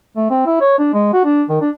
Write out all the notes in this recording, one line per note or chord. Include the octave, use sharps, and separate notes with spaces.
A3
C4
E4
C#5
D4
G#3
F#4
D4
D#3
D4